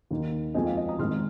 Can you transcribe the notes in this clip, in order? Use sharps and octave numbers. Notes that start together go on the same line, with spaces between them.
D#2 D#3 A#3
F2 F3 G#3 C4 D#5 G#5
F5
D#5
A#5 D#6
G#1 G#2 D#3 C6 F6